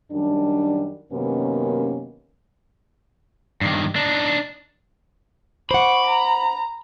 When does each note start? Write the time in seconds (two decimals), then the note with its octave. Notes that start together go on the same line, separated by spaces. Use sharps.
0.12 F#2 D#3 G3 D4
1.12 F#2 C3 D#3 A#3 B3 C#4
3.61 G2 D#3
3.96 D4 D#4
5.71 C5 F#5 B5 C#6 D6
6.07 A#5